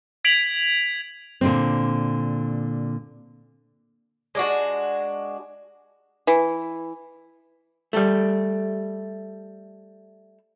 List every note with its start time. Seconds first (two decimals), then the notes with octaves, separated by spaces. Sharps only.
0.25 G#6 B6 D7 F7 F#7
1.41 A#2 D3 C4
4.35 G#3 D4 F#4
6.27 E3
7.93 G3 A3